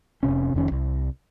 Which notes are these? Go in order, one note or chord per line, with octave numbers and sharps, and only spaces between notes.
F1 C#2 C3 C#4
F1 F2 D#3 C#4
C2